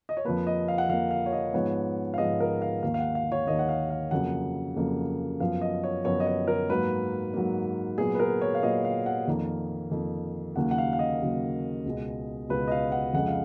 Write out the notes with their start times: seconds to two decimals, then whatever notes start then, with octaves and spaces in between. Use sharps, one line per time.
0.09 D#5
0.17 C#5
0.25 F2 F3 A#3 B4
0.47 D#5
0.68 F5
0.78 F#5
0.89 F2 F3 A#3 F5
1.11 F5
1.26 C#5
1.33 D#5
1.54 G#2 F3 G#3 B3 C#5
2.14 F5
2.18 G#2 F3 G#3 B3 D#5
2.40 A#4
2.62 F5
2.82 D#2 D#3 A#3 F5
2.94 F5
2.99 F#5
3.15 F5
3.32 C#5
3.47 D#2 D#3 A#3 D#5
3.59 F#5
3.69 F5
3.90 F5
4.11 F2 C#3 F#3 A#3 F#5
4.76 F2 C#3 F#3 A#3
5.40 F#2 F3 B3 F5
5.61 D#5
5.84 C#5
6.05 F#2 F3 B3 C#5
6.20 D#5
6.27 C#5
6.48 A#4
6.69 G#2 F#3 A#3 B4
7.34 G#2 F#3 A#3
7.98 A#2 F#3 B3 G#4
8.15 B4
8.19 A#4
8.42 C#5
8.55 F5
8.62 A#2 F#3 B3 D#5
8.85 F5
9.06 F#5
9.27 F2 D#3 A#3
9.91 F2 D#3 A#3
10.56 D#2 C#3 F#3 A#3 F#5
10.71 F#5
10.78 F5
10.93 F5
10.99 D#5
11.21 D#2 C#3 F#3 A#3
11.86 C#2 B2 G#3
12.50 C#2 B2 G#3 B4
12.68 D#5
12.72 F5
12.92 F#5
13.13 F2 C#3 G#3 F#5
13.28 F5